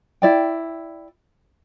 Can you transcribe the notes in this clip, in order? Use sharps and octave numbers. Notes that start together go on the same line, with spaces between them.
E4 D5 G5